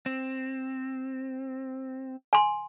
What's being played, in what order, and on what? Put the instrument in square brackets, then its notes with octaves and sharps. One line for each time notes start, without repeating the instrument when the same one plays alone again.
[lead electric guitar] C4
[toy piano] G#5 C6